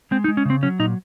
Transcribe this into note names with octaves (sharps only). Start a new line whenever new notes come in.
G#3 C4
D#4
G#3
C#4
C#3 C4
F#3 C#4
A#2 D#4